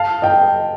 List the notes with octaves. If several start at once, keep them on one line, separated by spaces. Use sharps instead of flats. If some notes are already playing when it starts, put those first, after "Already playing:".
Already playing: F5 A5
D#5 G5